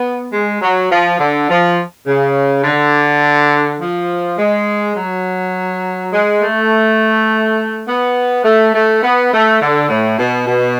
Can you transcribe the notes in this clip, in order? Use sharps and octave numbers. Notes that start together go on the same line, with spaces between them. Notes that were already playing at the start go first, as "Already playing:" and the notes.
Already playing: B3
G#3
F#3
F3
D3
F3
C#3
D3
F3
G#3
F#3
G#3
A3
B3
A3
A3
B3
A3
D3
A2
B2
B2